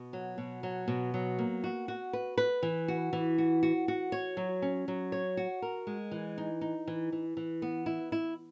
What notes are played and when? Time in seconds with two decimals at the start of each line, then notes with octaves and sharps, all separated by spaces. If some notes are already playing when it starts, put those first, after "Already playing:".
Already playing: B2
0.13 F#3
0.38 B2
0.63 F#3
0.88 B2
1.14 F#3
1.38 A#3
1.64 F#4
1.88 F#4
2.13 B4
2.38 B4
2.63 E3
2.88 F#4
3.13 E3
3.38 F#4
3.63 F#4
3.88 F#4
4.12 C#5
4.37 F#3
4.62 C#4
4.88 F#3
5.12 C#5
5.37 F#4
5.62 A#4
5.87 G#3
6.11 E3
6.38 D#4
6.61 D#4
6.87 E3
7.12 E3
7.37 E3
7.62 B3
7.86 E4
8.12 E4